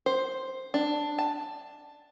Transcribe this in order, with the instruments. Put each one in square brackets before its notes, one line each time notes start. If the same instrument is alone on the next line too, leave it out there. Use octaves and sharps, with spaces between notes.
[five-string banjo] C5
D4
A5